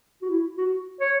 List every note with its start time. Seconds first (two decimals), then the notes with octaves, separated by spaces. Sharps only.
0.22 F#4
0.30 E4
0.58 F#4
1.01 C#5